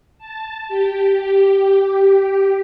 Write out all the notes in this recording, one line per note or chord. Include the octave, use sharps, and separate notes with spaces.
A5
G4